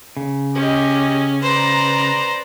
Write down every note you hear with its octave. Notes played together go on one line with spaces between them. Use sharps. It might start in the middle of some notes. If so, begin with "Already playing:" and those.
C#3
C#4 G4 D#5
B4 C5 D5 A#5